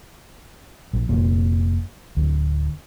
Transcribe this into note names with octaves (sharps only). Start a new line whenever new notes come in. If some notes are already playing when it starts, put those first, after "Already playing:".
A#1
F1 A#2
D1 D2